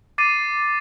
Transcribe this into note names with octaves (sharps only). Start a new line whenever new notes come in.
D6 A6 C7 D#7